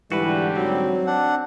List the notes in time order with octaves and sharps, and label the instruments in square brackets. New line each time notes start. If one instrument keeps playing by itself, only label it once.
[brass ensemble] G#2 D3 G3 [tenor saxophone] E3 [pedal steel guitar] F#4 B4
[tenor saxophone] F#3 [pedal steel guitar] C4
[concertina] D4 F#5